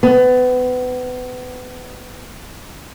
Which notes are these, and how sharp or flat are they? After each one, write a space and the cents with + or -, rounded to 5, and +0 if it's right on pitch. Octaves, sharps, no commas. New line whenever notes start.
B3 +30